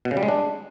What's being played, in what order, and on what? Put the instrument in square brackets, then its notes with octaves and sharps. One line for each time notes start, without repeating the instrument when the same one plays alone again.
[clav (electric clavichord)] B2
C#3
G3
G#3
D4